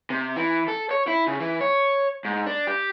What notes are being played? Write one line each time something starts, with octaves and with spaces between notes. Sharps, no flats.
C3
E3
A4
C#5
E4
C#3
E3
C#5
G#2
D4
G4